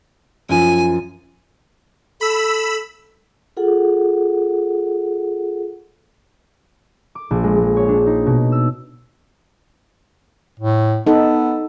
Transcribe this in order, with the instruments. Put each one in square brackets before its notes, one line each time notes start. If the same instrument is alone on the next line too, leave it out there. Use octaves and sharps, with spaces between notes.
[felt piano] F#2 F3 [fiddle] G#5
[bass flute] A4 [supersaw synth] B5 E6
[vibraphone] F4 G#4 A4 F#5
[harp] D6
A#1
G#3
G#3
C#5
D4
D#4
B2
E6
[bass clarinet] A2
[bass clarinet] B3 [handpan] D#4 A4